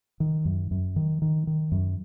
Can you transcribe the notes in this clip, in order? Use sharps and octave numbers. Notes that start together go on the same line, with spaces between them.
D#3
F#2
F#2
D#3
D#3
D#3
F#2